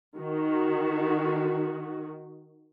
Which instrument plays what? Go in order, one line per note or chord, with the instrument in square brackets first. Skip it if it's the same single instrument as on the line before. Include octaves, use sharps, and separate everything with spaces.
[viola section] D#3 F#4